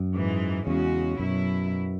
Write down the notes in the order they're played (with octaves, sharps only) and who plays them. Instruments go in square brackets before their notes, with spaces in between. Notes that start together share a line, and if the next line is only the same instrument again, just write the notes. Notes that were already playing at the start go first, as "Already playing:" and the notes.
Already playing: [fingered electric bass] F#2
[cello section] G#2 E3 G#3
[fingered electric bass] E2 [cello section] C#3 G#3 C#4 F#4
[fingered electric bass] F#2 [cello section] B2 F#3 E4